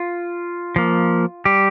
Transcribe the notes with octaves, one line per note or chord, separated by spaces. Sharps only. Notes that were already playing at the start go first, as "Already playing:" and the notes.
Already playing: F4
F3 A#3
G3 G4